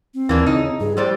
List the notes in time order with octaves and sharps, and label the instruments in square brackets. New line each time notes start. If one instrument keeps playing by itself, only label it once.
[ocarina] C4
[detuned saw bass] D#2 [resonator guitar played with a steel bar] E3 A#3 D4
[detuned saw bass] C#3 [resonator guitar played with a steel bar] D#4
[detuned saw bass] G2 [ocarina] G#4
[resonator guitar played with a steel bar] F2 A2 D5 [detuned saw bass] G3 [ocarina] C5